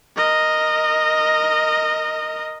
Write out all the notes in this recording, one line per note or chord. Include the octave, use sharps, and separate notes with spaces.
A#4 D#5